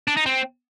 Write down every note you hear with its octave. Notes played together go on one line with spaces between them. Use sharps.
D4
D#4
C4